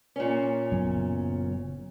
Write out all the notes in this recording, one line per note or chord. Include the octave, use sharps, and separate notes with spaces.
A#2 C#4
F#1 F#3 B3